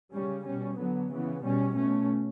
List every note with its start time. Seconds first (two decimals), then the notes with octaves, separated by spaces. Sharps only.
0.13 C#3 G3 C#4
0.45 B2 G3 C#4
0.78 D3 F#3 B3
1.11 C#3 E3 B3
1.44 B2 G3 C#4
1.76 B2 A3 C#4